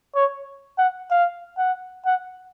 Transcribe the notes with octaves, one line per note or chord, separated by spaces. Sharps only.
C#5
F#5
F5
F#5
F#5